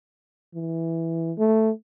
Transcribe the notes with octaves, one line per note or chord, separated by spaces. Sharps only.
E3
A3